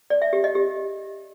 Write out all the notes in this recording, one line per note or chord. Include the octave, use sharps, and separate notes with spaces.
D5
E5
G4
D#5
G4